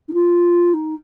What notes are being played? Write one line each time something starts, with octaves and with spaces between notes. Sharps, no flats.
D#4
F4
D#4